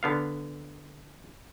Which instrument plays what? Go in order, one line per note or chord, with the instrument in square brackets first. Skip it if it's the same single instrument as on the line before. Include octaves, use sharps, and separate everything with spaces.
[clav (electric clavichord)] D3 B3 F5